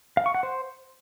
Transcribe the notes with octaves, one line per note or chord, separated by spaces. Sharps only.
F5
C#6
F#5
C5